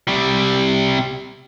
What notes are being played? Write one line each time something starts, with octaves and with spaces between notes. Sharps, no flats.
C3 G3